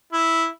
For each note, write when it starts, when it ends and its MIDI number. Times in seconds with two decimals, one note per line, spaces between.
0.13 0.47 64